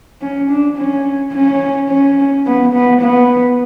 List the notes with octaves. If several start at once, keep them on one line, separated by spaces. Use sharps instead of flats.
C#4
D4
C#4
C#4
C#4
B3
B3
B3